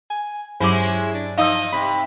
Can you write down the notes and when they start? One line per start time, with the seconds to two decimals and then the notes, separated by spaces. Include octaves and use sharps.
0.10 G#5
0.60 G2 F#3 G#3 C#4 E4 C5 D6
1.14 D4
1.38 F3 D#4 D#5 F5 D#6 E6
1.72 C3 B5